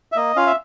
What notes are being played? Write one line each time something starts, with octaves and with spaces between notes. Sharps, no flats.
E5
A#3 D#5
C#4 F4 F5
E5